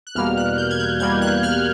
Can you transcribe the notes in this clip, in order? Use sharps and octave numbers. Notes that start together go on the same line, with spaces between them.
F#6
E2 B2 G3 A#3 F6
F#6
G6
G#6
G6
E2 B2 G3 A#3 G#6
F#6
F6